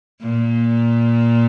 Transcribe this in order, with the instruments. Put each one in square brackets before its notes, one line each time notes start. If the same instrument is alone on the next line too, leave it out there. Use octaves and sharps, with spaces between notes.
[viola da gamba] A#2